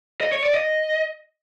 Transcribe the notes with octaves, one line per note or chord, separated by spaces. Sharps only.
D#5
C#5
D5
D#5